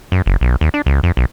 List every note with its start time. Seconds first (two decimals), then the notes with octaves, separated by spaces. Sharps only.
0.12 F#2
0.26 F#1
0.41 B1
0.61 D#2
0.74 D4
0.86 C#2
1.03 F2
1.17 B1